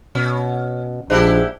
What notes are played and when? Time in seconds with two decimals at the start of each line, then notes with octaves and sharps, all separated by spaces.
0.15 B2 C#4
1.10 A#1 G#2 D4 E4 G4